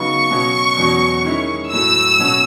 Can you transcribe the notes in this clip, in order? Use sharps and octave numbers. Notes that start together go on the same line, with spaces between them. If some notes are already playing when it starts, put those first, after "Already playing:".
Already playing: C#3 F#3 B3 D#4 C#6
B2 F#3 C#4
E2 B2 F#3 C#4
D#3 G#3 C#4 E4
A2 F#3 A3 E6
B2 F#3 C#4 F#4